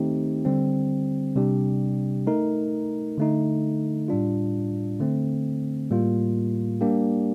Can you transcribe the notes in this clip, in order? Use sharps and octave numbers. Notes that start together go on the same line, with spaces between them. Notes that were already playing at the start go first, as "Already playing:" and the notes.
Already playing: D#3 A3 C4 D#4 G4
D3 G3 C4
C3 G3 D4 G4
A3 D#4 A#4
D3 A3 D#4
A2 G3 D4 F4
D3 A3 C4
A2 G3 A#3 F4
G3 A#3 D4 G4